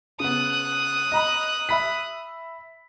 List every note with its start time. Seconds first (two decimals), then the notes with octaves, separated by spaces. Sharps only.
0.20 C#3 B3 D#6 F#6
1.12 D#5 A#5 B5
1.69 E5 B5 B6